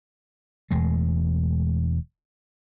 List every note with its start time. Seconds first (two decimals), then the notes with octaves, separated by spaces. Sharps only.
0.71 E1 E2 G#3 A3